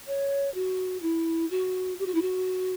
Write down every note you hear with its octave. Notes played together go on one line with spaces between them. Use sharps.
C#5
F#4
E4
F#4
G4
F#4
E4
F#4